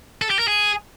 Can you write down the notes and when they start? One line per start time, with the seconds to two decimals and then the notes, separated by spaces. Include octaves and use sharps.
0.22 A4
0.30 G4
0.39 A#4
0.48 G#4